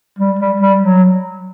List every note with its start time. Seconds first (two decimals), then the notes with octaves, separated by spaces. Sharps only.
0.19 G3
0.39 G3
0.60 G3
0.81 F#3